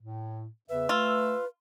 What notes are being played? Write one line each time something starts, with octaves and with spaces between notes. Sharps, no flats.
A2
E2 C#3 B4 E5
A3 F4 E6